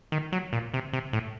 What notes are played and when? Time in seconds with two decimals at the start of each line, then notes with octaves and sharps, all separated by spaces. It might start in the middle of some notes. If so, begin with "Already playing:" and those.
0.12 D#3
0.32 F#3
0.53 A#2
0.74 C3
0.93 C3
1.13 A2